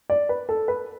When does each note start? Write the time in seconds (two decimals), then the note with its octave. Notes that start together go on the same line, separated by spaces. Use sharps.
0.10 D5
0.29 B4
0.49 A4
0.68 B4